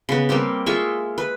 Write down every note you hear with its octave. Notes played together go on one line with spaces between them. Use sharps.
C#3 B3
G3 A#3 C4 G4
G#3 F4 E5 C#6
B4